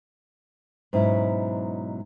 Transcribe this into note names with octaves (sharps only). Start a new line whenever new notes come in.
G#2 B2 F#3 C#4 E4